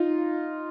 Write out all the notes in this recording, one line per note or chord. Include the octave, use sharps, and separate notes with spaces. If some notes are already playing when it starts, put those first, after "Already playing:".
Already playing: D#4 F4